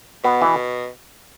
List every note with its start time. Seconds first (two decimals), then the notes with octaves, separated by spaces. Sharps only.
0.24 B2 B3
0.42 E3